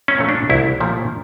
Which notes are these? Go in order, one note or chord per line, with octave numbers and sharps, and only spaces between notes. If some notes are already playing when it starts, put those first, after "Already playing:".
C#4
A#2 F3 A3
D4
C2 E4
A#2 F3 A3